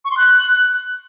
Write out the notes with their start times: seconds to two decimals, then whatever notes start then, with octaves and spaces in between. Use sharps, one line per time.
0.05 C#6
0.11 C6
0.17 F#6